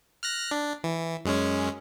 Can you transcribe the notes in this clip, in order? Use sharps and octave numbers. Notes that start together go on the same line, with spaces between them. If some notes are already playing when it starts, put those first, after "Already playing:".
F6 F#6 A#6
D4
E3
F#2 G#3 C#4